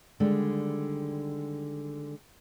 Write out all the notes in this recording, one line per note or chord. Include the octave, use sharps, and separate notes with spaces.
D3 D#3 G3 G#3